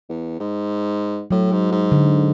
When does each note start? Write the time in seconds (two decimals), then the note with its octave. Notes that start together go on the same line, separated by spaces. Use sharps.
0.09 E2
0.40 G#2
1.31 A2 F#3
1.52 G#2
1.72 G#2
1.92 D3